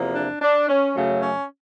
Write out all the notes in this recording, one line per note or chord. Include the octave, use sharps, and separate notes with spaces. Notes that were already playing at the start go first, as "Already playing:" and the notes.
Already playing: E2 C3 F3 A#3
D4
D4
C#4
F#2 C#3 F#3 A3
C#4